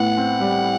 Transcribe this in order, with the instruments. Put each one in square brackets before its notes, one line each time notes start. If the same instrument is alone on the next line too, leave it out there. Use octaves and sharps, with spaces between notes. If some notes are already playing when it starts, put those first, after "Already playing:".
Already playing: [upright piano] A2 B3 [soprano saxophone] F#5
[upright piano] C4
G3